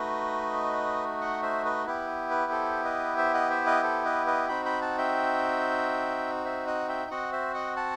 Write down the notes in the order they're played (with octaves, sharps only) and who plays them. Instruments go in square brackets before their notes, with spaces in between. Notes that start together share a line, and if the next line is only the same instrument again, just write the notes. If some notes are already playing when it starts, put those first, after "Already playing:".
Already playing: [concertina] A3 D#4 F#4 B4 D#5
D#5 F#5
C5 E5
B4 D#5
B3 E4 G4 B4
B4
A4 C5
B4 D#5
C5 E5
D#5 F#5
C5 E5
B4 D#5
A4 C5
B4 D#5
B4 D#5
C4 D#4 F#4 G5 B5
G5 B5
F#5 A5
E5 G5
C5 E5
D#5 F#5
E5 G5
C4 F#4 D#5 F#5
C5 E5
D#5 F#5
F#5 A5